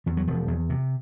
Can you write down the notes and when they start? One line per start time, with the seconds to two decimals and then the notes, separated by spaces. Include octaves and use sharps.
0.06 E2 F3
0.17 F#3
0.27 E1 F3
0.48 E2
0.70 C3